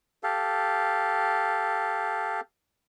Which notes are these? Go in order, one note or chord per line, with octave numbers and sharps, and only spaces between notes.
G4 A4 F5